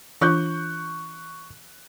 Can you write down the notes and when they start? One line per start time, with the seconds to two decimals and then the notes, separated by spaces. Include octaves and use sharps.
0.21 E3 D4 F4 C#6 F#6 G6